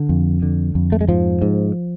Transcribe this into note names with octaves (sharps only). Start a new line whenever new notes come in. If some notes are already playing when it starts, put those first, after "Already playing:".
Already playing: D3
F2
D3
F2
A3
G#3
G#2 F3
G#2